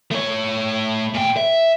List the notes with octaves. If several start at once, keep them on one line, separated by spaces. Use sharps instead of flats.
A3 C#5
A#2 G5
E5